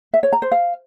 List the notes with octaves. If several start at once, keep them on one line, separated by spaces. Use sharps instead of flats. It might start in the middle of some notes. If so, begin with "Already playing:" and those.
E5
C#5
A#5
C5
F5